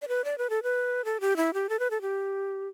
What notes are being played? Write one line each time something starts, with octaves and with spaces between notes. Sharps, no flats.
D5
B4
D5
B4
A4
B4
A4
G4
E4
G4
A4
B4
A4
G4